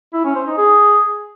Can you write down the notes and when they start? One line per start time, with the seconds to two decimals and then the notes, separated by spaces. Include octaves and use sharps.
0.14 E4
0.25 C#4
0.36 C5
0.47 D#4
0.58 G#4